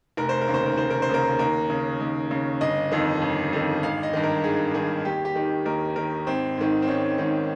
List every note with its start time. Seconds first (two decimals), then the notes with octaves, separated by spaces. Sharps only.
0.17 F1 A#4
0.29 C5
0.41 A#4
0.48 D#2 C#3
0.54 C5
0.66 A#4
0.77 F1 C5
0.90 A#4
1.02 C5
1.09 D#2 C#3 A#4
1.39 D#2 A#4
1.70 C#3
2.00 D#2
2.31 C#3
2.61 G1 D#5
2.91 F2 D#3
3.22 G1
3.53 F2 D#3
3.83 G#1 F5
4.03 D#5
4.13 G2 D#3
4.23 A#4
4.43 G#1 G#4
4.74 G2 D#3 G#4
5.05 D#2 G4
5.25 G4
5.35 D#3
5.65 D#2 A#4
5.96 D#3 A#4
6.27 G#1 C4
6.57 G#2 D#3
6.82 C4
6.88 G#1 C#4
7.18 G#2 D#3